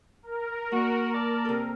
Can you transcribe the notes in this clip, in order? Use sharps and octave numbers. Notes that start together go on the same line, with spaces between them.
A#4
A#3 F#4
D5 A5
C3 A4